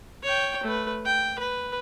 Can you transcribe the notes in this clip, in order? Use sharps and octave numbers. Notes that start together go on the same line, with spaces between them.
C#5 G5
A3 B4
G5
B4